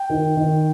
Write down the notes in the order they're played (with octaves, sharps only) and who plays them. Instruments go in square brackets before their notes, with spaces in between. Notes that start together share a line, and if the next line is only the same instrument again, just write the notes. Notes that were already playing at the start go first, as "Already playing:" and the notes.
Already playing: [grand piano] G5
D#3
D#3